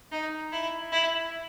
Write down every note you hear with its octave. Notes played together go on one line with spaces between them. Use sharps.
D#4
E4
E4